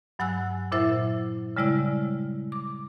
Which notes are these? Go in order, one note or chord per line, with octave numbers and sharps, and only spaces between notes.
G2 F#3 F#5 G#5 E6 F#6
A#2 F#3 E4 C5 E5 A6
C#3 G3 G#3 E4 D5 E6
D6